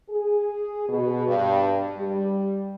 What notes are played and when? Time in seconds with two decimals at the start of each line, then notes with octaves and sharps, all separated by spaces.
0.10 G#4
0.89 B2
1.27 G2
1.98 G3